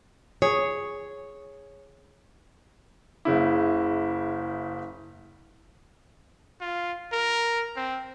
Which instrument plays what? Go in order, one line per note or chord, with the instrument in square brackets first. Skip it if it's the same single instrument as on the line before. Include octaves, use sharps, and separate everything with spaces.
[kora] G#4 [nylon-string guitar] C#5
[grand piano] F#1 C#3 E4
[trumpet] F4
A#4
C4